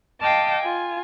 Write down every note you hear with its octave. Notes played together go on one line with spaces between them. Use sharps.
D#5 F5 G5 A5 D6
F4 G#5